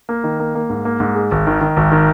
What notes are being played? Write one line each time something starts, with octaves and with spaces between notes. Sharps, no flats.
A#3
D#3
A#3
A#3
G#2
A#3
G#2
G#3
G#1
D#3
D#3
G#1
D#3